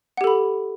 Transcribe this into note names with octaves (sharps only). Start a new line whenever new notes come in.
G4 A4 F#5 B5